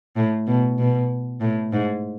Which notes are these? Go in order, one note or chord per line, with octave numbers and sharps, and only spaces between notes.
A2
B2
B2
A2
G#2